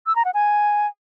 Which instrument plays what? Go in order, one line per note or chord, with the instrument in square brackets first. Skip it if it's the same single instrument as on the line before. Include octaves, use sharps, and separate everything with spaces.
[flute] E6
A#5
F#5
G#5